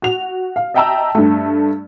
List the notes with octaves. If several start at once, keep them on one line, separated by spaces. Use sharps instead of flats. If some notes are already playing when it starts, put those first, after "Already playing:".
F#4 F7
F5
D#5 E5 G5 A5 A#5 E6
G2 A3